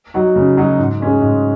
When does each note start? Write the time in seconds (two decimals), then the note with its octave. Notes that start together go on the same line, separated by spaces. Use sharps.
0.14 F#3 D#4 F#4
0.36 C#3
0.57 F#3 D#4 F#4
0.79 G#2
1.00 G#3 C#4 G#4
1.22 G#2